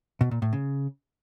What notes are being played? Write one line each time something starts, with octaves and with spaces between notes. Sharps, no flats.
B2
A#2
A2
C#3